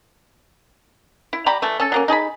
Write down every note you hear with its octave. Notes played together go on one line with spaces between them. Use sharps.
E4
G3 G4 A#5 B5
E3 A3
C#4 A4
F#3 A#3 C#4
D#4 G#4 A5 B5